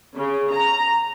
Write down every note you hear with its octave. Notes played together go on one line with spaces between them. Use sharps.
C#3
A#5